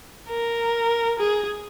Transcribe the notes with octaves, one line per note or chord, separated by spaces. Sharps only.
A#4
G#4